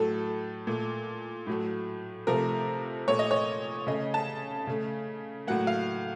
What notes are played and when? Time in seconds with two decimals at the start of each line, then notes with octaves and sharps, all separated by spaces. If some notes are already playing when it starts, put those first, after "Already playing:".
Already playing: A2 F#3 A3 A4
0.67 A#2 A3
1.47 A2 F#3 A3
2.27 C3 F3 A3 A#4
3.08 A#2 A3 C#5
3.19 D#5
3.31 C#5
3.87 C#3 A3 D#5
4.14 A5
4.67 C#3 A3
5.47 A2 F#3 A#3 F#5
5.67 F5